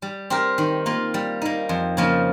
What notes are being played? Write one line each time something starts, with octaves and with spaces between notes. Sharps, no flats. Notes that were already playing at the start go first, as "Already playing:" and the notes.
G3
C4 G4 A#4
D#3
A#3 F4
G3
A#3 D#4
F2
C#3 F3 A#3